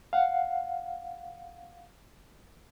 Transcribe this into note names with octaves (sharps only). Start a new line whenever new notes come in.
F5 F#5